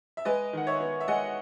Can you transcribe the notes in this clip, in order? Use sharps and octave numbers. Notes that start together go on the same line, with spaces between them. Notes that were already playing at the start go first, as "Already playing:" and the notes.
E5
G#3 B4 D#5
D#3 F#5
C#5 E5
B3
E5
G#3 D#5 F#5